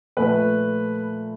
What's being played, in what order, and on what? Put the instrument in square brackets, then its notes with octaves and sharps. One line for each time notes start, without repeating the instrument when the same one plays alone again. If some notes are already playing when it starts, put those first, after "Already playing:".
[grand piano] A#2 F3 A3 B4